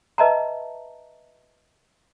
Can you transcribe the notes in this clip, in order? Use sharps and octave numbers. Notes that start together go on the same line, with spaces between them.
B4 D#5 E5 A5 A#5